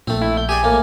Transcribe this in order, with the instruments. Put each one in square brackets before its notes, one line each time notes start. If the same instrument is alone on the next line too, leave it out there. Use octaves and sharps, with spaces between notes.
[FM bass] A#1 [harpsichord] A3 C4
[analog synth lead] E4
G6
[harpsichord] G4 G#4 D5 [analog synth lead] G#5
[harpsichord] A2 A#3